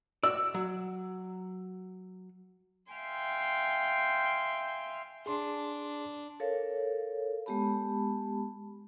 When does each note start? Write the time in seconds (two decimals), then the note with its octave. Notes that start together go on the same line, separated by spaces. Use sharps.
0.23 F#4 D5 E6
0.54 F#3
2.91 E5 F5 G5 G#5 C6
5.26 D4 G#4 C6
6.40 A4 A#4 C#5 F5
7.46 G#3 B3 G4 A5 B5